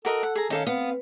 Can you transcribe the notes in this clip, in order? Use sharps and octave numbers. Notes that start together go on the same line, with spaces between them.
F#4 A4 A#4 D#5
F#5
G#4 A#5
D#3 C#4 D#4 A4 F5
B3 C4 F5